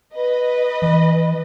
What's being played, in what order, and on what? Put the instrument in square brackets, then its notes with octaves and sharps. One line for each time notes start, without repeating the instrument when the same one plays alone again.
[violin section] B4 D#5
[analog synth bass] E3